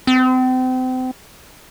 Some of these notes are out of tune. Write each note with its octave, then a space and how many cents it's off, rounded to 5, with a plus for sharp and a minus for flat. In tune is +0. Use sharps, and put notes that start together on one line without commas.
C4 -35